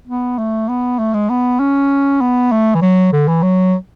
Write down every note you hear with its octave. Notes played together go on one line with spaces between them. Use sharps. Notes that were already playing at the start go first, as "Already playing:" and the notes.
B3
A3
B3
A3
G#3
B3
C#4
B3
A3
E3
F#3
D3
E3
F#3